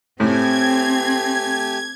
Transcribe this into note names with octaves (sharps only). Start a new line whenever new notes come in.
A2 A3 C4 G4 G#5 G#6